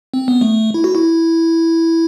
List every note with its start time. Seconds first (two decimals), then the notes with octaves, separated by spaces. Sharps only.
0.14 C4
0.28 B3
0.41 A3
0.74 E4
0.84 F#4
0.95 E4